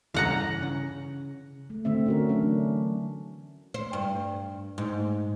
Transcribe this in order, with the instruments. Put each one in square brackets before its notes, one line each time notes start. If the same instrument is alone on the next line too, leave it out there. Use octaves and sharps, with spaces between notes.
[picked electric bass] G2 C#3 E3 [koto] F5 F#5 A#5
[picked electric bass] C#3
[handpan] A3
D3 A3 C4 E5
C#4 F#4 A#4
E3 F#3 A3 C#4 D4
[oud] C5
G2
G#2